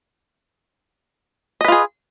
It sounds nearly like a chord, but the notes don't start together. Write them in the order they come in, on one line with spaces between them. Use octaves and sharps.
D#5 B4 F4 G#4